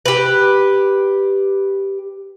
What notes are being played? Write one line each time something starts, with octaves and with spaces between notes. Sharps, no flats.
G4 B4